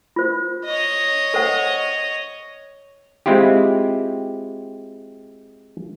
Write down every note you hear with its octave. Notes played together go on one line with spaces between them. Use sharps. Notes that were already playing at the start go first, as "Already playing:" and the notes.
F4 C5
C#5 D#5
A4 C5 F#5
G#3 C4 E4 F4 G4